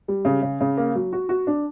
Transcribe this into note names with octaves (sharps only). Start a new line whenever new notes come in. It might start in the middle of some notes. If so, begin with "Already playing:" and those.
G3
C#3
C#3
C#3
A#3
F#3
F#4
F#4
D4